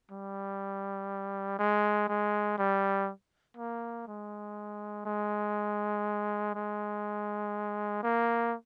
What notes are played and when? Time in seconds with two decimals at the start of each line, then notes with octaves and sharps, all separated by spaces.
0.11 G3
1.59 G#3
2.08 G#3
2.58 G3
3.57 A#3
4.07 G#3
5.06 G#3
6.55 G#3
8.03 A#3